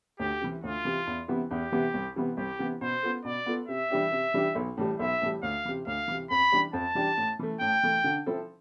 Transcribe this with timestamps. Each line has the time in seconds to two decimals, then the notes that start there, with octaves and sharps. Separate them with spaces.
0.19 D2 G4
0.41 C3 E3
0.63 D2 F4
0.85 C3 E3
1.07 E2
1.28 C3 E3 B3 E4
1.50 E2 G4
1.72 C3 E3 B3 E4
1.94 C2
2.16 C3 E3 B3
2.37 C2 G4
2.59 C3 E3 B3
2.81 B2 C5
3.03 B3 F4 A4
3.25 B2 D5
3.46 B3 F4 A4
3.68 C3 E5
3.90 E3 G3 D4 G4
4.12 C3
4.34 E3 G3 D4 G4
4.55 B1
4.77 A2 E3 G3
4.99 B1 E5
5.21 A2 E3 G3
5.43 D2 F5
5.65 C3 E3
5.87 D2 F5
6.08 C3 E3
6.30 F2 B5
6.52 E3 G3 D4 G4
6.73 F2 A5
6.95 E3 G3 D4 G4
7.17 A2
7.39 E3 A3
7.60 A2 G5
7.83 E3 A3
8.04 D3
8.26 F3 C4 E4 A4